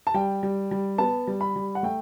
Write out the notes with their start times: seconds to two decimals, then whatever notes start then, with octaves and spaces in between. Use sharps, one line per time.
0.07 A5
0.14 G3 G5
0.43 G3
0.71 G3
0.98 B3 A5
1.27 G3
1.41 B5
1.56 G3
1.75 F#5
1.83 A3 G5